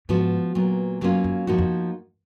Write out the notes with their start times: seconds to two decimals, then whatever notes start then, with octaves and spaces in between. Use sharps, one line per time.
0.09 G#2 F3 B3 F#4
0.55 A#2 F#3 B3
1.01 F#2 F#3 A#3 C#4 F4
1.24 F#2
1.47 G#2 F3 A#3 D#4 F#4
1.59 F2